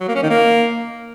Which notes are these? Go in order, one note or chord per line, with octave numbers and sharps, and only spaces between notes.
F#3
A#3
C#4
D#3
A#3